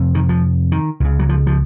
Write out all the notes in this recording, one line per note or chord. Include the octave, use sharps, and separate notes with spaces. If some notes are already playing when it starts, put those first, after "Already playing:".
Already playing: F2 C3
D#3
F3
D#3
C#2 C#3
F#3
F3
F3